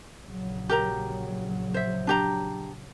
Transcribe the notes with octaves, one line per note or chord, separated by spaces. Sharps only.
A#1 C#3 F#3
G4 A#4 A#5
C5 E5
D4 G4 A#5